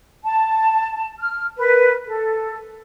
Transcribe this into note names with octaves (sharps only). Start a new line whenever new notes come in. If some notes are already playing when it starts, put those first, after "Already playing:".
A5
F6
A#4 B4
A4